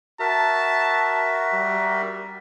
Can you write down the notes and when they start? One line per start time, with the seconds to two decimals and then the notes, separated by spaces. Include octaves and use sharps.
0.20 F#4 A#4 E5 A5
1.53 G3